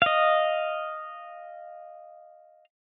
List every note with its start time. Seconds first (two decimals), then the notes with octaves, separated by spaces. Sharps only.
0.02 D#5 F5